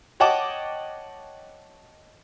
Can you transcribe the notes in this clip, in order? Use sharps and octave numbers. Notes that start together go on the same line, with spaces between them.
C#5 D#5 F#5 G5 A5 D6